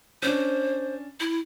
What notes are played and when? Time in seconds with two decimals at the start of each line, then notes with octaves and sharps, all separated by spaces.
0.22 C#4 D4 C5
1.20 E4